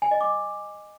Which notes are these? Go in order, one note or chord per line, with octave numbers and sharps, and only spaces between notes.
G#5
D#5
D6